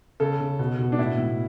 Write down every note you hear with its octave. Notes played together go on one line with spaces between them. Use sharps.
C#3 A4
C#3
B2
B2
D4
A2 E4
A2